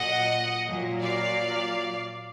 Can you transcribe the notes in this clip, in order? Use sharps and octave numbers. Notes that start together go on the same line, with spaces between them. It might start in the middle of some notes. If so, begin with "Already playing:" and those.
Already playing: A#2 F#3 D#5 F#5
A#2 F#3
D5 F5